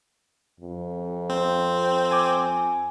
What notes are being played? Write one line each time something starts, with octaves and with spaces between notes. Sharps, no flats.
F2
C4
G#5 D6